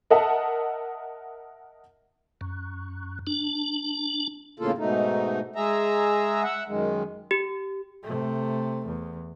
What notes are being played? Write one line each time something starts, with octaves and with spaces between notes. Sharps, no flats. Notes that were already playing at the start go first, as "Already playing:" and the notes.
A#4 D#5 E5 F#5 A5
F#2
D4
E2 A2 C#3 A#3 F4 A4
G#2 B2 A3 D#4
G#3 G#4 E5 A#5
E5 F#5
F#2 D#3 G#3
G4
C3 A3
E2